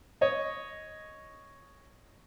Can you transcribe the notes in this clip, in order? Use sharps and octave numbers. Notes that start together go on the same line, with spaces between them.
C#5 D#5